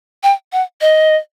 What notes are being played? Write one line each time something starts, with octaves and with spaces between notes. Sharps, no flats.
G5
F#5
D#5